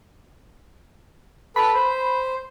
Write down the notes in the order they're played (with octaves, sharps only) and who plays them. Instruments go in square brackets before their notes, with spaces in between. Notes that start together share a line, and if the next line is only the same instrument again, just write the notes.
[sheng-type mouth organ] A4 B4 [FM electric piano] B5
[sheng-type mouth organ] C5